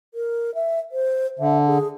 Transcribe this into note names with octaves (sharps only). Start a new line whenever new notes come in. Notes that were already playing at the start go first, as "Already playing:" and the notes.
A#4
E5
C5
D3 E5
G#4